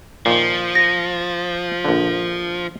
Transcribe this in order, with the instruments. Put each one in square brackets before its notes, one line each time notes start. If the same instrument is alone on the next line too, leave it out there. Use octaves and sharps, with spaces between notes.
[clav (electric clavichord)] A#2 D#3 [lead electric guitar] F3
[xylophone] A#6
[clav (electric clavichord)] A#1 D3